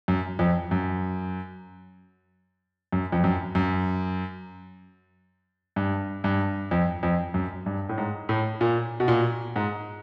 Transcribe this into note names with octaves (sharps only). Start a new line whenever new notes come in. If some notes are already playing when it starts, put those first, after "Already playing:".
F#2
F2
F#2
F#2
F2
F#2
F#2
G2
G2
F2
F2
F#2
G2
A2
G#2
A2
A#2
B2
A#2
G#2